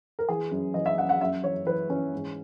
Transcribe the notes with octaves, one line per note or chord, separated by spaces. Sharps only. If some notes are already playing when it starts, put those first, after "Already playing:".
A#4
E3 G#4
F#2
E3 D#5
E5
F#2 F#5
F#5
F#2 E5
E3 C#5
E3 B4
E3 C#4
G#2